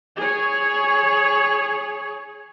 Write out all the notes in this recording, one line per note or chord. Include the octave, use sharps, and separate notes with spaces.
G#4 C#5